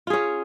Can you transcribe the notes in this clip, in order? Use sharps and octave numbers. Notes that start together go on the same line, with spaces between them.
C#4 F4 G#4